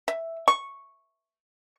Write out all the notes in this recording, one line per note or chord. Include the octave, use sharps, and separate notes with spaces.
E5
C#6